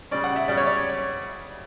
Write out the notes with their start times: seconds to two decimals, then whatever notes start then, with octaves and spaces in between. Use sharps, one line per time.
0.11 C#3 G3 C#4 D5
0.24 F#5
0.36 E5
0.48 C#3 G3 C#4 D5
0.58 C#5
0.67 D5